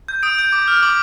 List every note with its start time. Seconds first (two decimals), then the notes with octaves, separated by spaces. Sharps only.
0.08 G6
0.23 D#6 D7
0.39 G6
0.52 D6
0.68 F6
0.83 D6 F#7